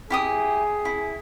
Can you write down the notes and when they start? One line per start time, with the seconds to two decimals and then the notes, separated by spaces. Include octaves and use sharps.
0.10 E4 G4 G#4 D#6
0.85 E4